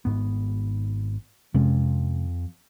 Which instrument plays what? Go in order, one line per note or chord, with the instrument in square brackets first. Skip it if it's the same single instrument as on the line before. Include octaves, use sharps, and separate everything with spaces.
[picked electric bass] G#1 G#2 B3
[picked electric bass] F2 [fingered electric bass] C3 G#3 C#4